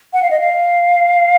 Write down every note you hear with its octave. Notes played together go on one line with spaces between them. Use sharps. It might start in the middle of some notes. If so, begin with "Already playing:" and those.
F#5
F5
D#5
F5